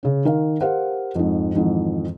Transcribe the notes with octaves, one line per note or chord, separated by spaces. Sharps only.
C#3 C#4
D#3 A#4 F5
G4 A#4 C5 F5 F#5
F2 G#2
F2 G#2 D#3 E3